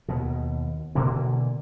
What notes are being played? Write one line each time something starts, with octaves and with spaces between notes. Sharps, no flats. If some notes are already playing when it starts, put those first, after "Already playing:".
D#2 B2
B2 D3 E3 A#3